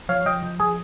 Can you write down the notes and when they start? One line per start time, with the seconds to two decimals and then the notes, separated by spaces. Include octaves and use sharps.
0.09 F3 C#5 F5
0.26 F3 D#5 G5
0.43 F3
0.60 F3 G#4